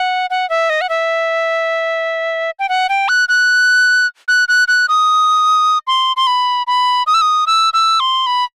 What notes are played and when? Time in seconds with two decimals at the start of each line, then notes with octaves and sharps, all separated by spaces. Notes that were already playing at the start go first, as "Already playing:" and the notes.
Already playing: F#5
0.30 F#5
0.50 E5
0.70 D#5
0.81 F#5
0.89 E5
2.59 G5
2.69 F#5
2.89 G5
3.09 F#6
3.29 F#6
4.28 F#6
4.48 F#6
4.68 F#6
4.89 D#6
5.87 C6
6.17 C6
6.27 B5
6.67 B5
7.07 D#6
7.14 E6
7.21 D#6
7.47 E6
7.73 E6
8.00 C6
8.26 B5